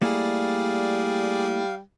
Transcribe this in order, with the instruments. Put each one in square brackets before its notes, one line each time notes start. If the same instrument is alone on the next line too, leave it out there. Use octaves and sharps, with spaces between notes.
[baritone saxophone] G3 [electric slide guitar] A3 A#3 E4 [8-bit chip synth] G#4 D5 [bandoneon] F5